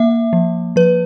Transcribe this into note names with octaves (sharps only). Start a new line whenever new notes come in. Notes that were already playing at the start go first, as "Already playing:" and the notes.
Already playing: A#3 E5
F3
F3 B4